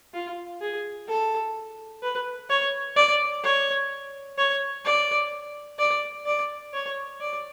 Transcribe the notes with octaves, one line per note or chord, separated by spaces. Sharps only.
F4
G#4
A4
B4
C#5
D5
C#5
C#5
D5
D5
D5
C#5
D5